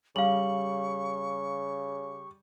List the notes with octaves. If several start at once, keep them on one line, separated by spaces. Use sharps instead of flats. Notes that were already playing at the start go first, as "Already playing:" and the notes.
C#3 G3 F5 C#6 F#7